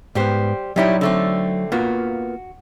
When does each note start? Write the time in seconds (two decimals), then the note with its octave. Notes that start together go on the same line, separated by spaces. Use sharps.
0.15 G#2 G3 B3 G4 C5
0.76 F#3 G3 D#4 E4 G4 C#5
1.01 D3 A3 C4
1.72 A#3 B3 F4 F#4